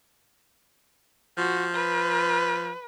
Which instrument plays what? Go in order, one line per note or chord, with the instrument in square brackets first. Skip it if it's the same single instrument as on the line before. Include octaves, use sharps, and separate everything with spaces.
[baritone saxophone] F3 [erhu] F#4
[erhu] B4